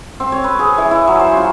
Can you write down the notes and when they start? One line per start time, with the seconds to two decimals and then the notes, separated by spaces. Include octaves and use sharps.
0.20 C4
0.32 C#5
0.44 B4
0.59 G#4
0.78 E3
0.91 E4
1.07 F#3
1.20 C5
1.37 F4